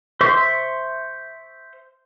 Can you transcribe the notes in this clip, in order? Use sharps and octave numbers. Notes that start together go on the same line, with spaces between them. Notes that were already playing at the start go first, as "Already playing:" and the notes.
C5 E5 C#6